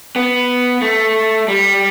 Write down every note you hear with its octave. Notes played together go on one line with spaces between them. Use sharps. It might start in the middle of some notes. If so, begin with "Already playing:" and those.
B3
A3
G3